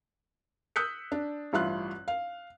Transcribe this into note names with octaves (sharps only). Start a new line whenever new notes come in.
D#6 E6 F#6 G6 B6 C#7
D4
A1 G2 E4 F4 F#6
F5